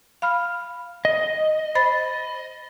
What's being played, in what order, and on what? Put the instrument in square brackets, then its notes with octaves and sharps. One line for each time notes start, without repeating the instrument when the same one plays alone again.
[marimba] F5 B5 F6
[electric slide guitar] D#5
[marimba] C5 B5 A6